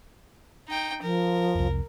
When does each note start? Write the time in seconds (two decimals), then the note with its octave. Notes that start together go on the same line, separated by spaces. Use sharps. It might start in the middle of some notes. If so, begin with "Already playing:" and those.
0.68 D#4 G5
1.02 F3 A#4
1.55 C2 F2